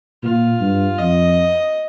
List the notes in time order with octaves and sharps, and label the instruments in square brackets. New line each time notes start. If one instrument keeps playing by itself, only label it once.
[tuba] A#2 [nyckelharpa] F4
[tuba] G2
[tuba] F2 [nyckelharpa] D#5